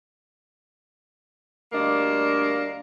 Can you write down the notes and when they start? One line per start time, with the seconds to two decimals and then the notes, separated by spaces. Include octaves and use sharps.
1.73 D2 G3 A#3 D4 D#5